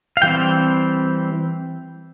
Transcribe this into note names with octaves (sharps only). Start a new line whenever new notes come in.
F5
E3 G3 C4 G5